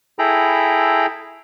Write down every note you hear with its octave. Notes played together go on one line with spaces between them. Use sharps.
E4 G#4 A4 G5 A#5 B5